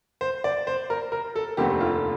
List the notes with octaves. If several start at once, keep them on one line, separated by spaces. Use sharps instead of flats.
C5
D5
C5
A#4
A#4
A4
F1 D#2 D3 A3 C4 G4
F4